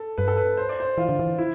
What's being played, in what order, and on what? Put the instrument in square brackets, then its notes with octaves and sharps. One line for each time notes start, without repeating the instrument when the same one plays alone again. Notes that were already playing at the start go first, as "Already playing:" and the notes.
Already playing: [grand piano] A4
[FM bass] G2 [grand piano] B4
[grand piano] A4
B4
C5
D5
C5
[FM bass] E3 [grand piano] F4
[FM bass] D3
E3
[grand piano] E4